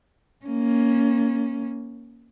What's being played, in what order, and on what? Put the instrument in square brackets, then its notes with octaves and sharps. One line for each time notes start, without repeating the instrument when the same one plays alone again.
[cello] A#3 C#4